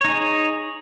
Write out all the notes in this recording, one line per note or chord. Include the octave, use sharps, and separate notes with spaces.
D#4 G#4 C#5